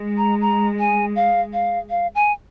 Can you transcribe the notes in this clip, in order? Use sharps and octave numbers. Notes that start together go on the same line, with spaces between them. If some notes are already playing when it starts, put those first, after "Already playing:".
Already playing: G#3
A#5
A#5
G#5
F5
F5
F5
G#5